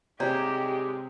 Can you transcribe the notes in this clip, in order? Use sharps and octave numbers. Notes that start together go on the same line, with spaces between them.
G#2 C3 G3 G#3 G4 C#5 D5 A#5